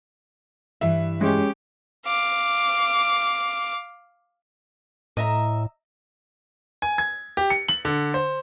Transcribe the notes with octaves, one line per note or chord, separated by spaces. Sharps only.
G2 E3 E5
G#3 C#4 G4
F5 D6
A2 D#5 E5 A#5
G#5
G#6
G4
C#7
F#7
D3
C5